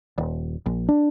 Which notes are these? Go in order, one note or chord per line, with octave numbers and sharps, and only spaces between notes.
D#1
A#1
D4